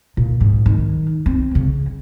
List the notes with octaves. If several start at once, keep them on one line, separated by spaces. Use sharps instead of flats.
A#2
G#2
D#3
C4
C#3